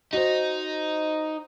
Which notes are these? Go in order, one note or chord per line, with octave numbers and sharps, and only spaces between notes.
D#4 F#4 C5